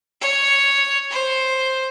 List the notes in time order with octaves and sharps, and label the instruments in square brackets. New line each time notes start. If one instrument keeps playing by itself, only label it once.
[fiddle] C#5
C5